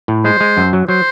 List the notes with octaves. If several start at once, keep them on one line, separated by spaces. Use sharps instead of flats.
A2
G#3 C5
G#3
F#2
F#3
F#3 C5